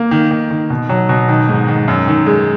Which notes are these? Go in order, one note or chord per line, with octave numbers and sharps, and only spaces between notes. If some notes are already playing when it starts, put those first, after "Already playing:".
Already playing: A#3
D#3
D#3
D#3
B2
F#3
B2
D#3
G#2
D#3
F#2
D#3
G#3